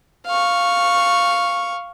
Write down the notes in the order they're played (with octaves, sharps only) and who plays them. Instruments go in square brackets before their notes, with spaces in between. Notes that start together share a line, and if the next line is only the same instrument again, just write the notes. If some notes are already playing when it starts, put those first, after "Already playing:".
[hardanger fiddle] F5 C#6